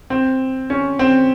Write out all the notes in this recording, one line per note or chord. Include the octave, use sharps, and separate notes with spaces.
C4
C#4
C4